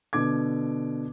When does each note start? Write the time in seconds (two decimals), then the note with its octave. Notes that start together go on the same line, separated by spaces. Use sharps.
0.13 B2 D3 D6 G#6